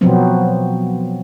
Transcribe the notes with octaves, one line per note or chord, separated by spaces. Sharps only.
B2 F3 F#3 B3 C4